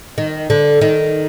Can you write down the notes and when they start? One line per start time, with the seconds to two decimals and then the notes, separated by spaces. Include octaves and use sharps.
0.18 D#3
0.50 D3
0.81 D#3